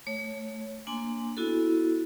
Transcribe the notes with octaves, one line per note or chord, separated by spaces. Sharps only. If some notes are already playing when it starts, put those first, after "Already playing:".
A3 C#5
A#3 D4 G#5 C6
B3 E4 F#4 A4